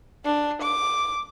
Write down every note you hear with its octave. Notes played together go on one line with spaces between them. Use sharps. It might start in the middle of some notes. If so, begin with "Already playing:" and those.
D4
D6